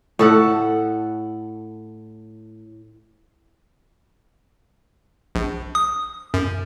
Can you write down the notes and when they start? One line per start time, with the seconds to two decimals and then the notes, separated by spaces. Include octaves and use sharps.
0.19 A2 A4 F#5
5.35 A#1
5.75 D#6
6.34 F#2